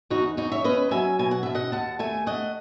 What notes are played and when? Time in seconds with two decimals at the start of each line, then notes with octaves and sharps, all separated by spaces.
0.10 E2 D#4 F#4
0.37 E2 D#4 F#4
0.52 C#5 E5
0.64 C#4 B4 D#5
0.91 F#3 E5 G#5
1.19 B2 G#5
1.31 F#5
1.43 B2 E5
1.55 D#5 F#5
1.72 D#2 F#5 A5
1.99 A3 E5 G#5
2.26 A3 D#5 F#5